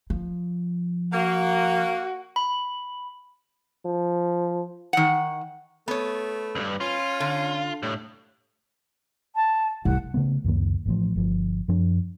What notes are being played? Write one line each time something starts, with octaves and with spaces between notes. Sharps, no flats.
F3
A#3 F#4
B5
F3
D#3 F#5
A3 B3 C#5
C#2 G2
C#4 F4
D3
A2 G3
A5
C2 F#5
C#3 A3 B3
C#2 F#2 D#3 A#3
A1 A2 F3
G1 F3
F#2 F3 D4